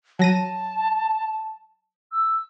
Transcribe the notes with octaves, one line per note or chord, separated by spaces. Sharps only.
F#3 A5 A#6 D#7
E6